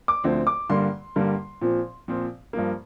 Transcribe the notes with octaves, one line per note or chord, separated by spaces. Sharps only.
D6
D2 D3 F3 C4
D6
G2 D3 G3 A#3 C6
G2 D3 G3 A#3
A#2 F3 C4
A#2 F3 C4
G2 F3 A#3